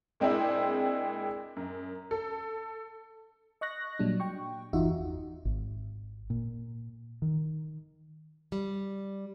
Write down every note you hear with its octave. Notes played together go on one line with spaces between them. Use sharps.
A#2 G#3 C4 D4 E4
F#2
A4
D#5 C#6 F#6 A#6
A#2 F#3 G3 D4
G5 C#6
G1 E2 D#4 F4 F#4 E5
G#1
A#2
D#3
G3